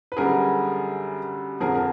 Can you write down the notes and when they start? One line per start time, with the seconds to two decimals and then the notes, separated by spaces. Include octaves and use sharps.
0.12 B4
0.17 F#2 D3 G3 G#4 A#4
1.60 F2 D3 F3 G#4 A#4
1.75 A#4